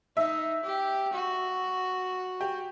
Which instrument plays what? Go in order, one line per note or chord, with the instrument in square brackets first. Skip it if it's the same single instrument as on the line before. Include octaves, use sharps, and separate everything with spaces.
[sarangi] D#4 [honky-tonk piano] E5
[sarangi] G4
F#4
[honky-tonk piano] G4